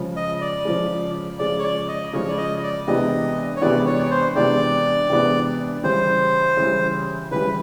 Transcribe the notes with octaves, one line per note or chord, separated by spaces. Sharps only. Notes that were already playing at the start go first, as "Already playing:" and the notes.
Already playing: C#3 F3 G#3
D#5
D5
C#3 F3 G#3
C#3 F3 G#3 D5
C#5
D5
D#5
C#3 F3 G#3 C#5
D5
D#5
D5
C3 E3 G#3 B3 D4 D#5
C#5
C3 E3 G#3 B3 D4 D5
C#5
D5
C#5
C5
C3 E3 G#3 B3 D4 D5
C3 E3 G#3 B3 D4
C#3 E3 G3 C5
C#3 E3 G3
C#3 E3 G3 B4